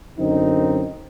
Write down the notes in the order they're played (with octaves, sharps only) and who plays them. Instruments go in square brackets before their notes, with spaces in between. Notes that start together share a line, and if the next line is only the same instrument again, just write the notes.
[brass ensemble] F#2 D3 C4 D#4